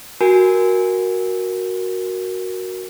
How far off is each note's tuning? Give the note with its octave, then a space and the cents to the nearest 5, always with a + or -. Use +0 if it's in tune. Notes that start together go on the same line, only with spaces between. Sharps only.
F#4 +0 A#4 +10 G#5 +0